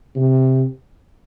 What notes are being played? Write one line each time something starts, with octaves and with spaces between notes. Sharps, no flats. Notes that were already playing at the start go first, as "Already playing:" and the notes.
C3